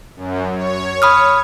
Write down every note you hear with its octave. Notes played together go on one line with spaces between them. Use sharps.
F#2
C#5
B5 D#6 F6